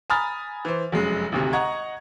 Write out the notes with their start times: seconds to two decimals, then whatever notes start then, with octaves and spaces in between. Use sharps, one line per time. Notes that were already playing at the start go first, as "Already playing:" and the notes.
0.10 G#5 A#5 B5 D#6 F6 A6
0.65 E3 C5
0.92 F1 F#2 G#3
1.32 G#1 D2 C3
1.53 D#5 F#5 A#5 C#6 G#6